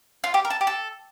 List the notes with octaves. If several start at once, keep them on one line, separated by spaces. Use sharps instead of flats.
F4
G4
A#4
A4
G4
A4